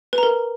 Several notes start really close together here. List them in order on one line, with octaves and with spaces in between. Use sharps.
B4 A#5 A#4